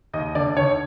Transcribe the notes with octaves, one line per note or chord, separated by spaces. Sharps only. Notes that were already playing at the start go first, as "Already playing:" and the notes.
D#2 D#5
D3 D5
D3 C#5